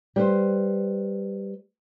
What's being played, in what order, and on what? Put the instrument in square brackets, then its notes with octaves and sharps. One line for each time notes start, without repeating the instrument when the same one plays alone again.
[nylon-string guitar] G3 B4 C5